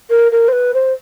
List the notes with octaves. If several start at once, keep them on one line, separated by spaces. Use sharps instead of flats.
A#4
A#4
C5
B4
C5